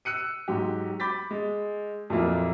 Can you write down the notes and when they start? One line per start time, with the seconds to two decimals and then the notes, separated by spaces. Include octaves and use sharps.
0.05 E6 F#6 C#7 D#7
0.48 G#2 F#3 G4
1.00 B5 D6 G6 A6 B6
1.31 G#3
2.10 F2 A#2 F#3 A#3 E4 F4